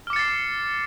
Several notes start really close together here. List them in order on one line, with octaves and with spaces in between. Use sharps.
F6 D6 C#7 A6 C7